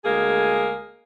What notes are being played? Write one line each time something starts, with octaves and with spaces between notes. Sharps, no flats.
D2 G#3 A#3 G#4